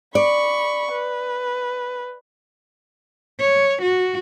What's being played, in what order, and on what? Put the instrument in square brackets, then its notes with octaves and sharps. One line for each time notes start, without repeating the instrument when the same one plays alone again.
[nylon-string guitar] D5 [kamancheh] B5 C#6
[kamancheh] B4
[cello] C#5
F#4